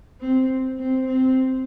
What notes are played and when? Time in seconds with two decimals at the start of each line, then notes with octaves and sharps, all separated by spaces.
0.20 C4
0.78 C4
1.07 C4